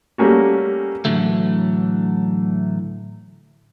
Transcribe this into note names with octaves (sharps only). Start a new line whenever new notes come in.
G3 A3 A#3 C#4 F#4
A2 D3 E3 F#3 A3